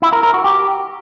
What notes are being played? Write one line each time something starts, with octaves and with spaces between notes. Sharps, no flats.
E4
A#4
A#4
F#4
G4